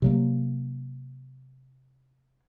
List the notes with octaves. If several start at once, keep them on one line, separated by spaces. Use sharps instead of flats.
C3 F#3 A#3